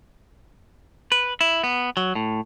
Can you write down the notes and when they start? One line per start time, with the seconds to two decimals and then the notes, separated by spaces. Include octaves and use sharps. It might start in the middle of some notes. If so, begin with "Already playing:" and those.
1.12 B4
1.41 E4
1.64 B3
1.97 F#3
2.15 A2